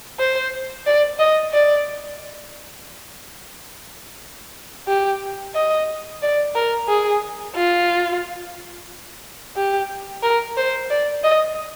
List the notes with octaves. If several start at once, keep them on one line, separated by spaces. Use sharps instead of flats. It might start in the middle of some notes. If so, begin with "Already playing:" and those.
C5
D5
D#5
D5
G4
D#5
D5
A#4
G#4
F4
G4
A#4
C5
D5
D#5